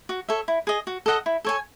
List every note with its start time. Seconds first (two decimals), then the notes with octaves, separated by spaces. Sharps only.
0.09 F#4
0.29 A4 C#5 E5
0.48 E4
0.67 G#4 D#5
0.87 F#4
1.06 A4 D#5 F#5
1.26 E4
1.45 A4 C#5 G#5